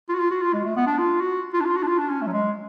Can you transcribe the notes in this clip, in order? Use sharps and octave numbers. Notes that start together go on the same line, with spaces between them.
F4
F#4
F4
F#4
F4
G#3
A3
B3
D4
F4
F#4
F4
D4
F4
F#4
D4
F4
D4
C#4
A3
F#3
G#3